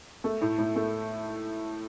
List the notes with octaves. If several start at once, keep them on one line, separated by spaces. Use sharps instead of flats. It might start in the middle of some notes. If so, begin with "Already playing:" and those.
A3
A2
A2
A3